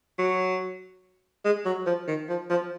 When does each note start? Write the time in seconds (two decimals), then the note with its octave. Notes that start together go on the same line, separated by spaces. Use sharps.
0.18 F#3
1.45 G#3
1.65 F#3
1.86 F3
2.08 D#3
2.29 F3
2.50 F3